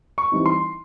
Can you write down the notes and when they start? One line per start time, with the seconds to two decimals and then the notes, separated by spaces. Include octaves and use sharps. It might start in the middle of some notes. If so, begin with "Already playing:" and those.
0.18 C#6
0.32 E3 G3 C4 D#4
0.46 C6